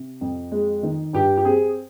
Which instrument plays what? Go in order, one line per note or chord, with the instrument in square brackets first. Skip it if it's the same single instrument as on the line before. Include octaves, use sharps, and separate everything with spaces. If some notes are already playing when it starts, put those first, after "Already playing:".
Already playing: [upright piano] C3
F2
G#3
D#3
G2 G4
G4
C4 G#4